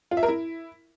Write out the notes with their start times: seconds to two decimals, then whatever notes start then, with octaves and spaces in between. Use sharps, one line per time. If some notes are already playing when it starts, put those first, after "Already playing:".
0.11 F4
0.17 E5
0.23 A#4
0.28 E4